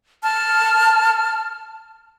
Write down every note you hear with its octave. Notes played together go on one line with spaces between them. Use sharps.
A5 F6